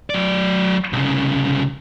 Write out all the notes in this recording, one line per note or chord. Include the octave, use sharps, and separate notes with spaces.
F#3 D5
C2 C#3